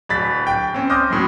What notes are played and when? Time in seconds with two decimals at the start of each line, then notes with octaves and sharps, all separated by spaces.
0.09 D1 B5 A6 B6
0.47 G5
0.74 C4 C#4
0.90 C6 D6 D#6 F6 G6 A#6
1.10 F#2 A2 F#3